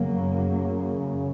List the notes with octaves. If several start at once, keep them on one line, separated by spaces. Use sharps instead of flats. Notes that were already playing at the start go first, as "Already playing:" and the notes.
Already playing: F#2 C#3 F#3 A#3